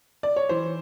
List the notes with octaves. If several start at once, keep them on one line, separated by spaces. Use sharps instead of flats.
D5
C#5
E3 C5